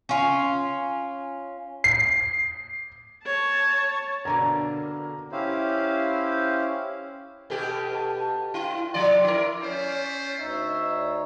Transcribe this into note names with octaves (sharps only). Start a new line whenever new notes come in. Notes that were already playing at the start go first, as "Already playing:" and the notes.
C#4 F4
C7
C#5 A5
B2 D3 A#3 A#5
C#4 E4 G4 C5 F5
B2 G4 A4
A5
E4 G5
F3 D5 C6
E4 A#4 D6
A3 B3 C#4 C5 C#5
D2 D#4 C#5 D#5 E5
D5